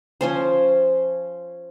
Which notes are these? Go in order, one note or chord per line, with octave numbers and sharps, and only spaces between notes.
F3 C#4 C5